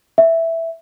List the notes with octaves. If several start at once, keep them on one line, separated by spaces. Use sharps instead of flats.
E5